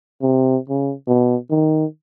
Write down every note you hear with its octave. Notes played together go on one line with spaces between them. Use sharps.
C3
C#3
B2
D#3